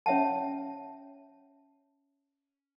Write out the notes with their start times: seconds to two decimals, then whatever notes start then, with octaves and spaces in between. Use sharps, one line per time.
0.06 C#4 C#5 E5 F#5 A5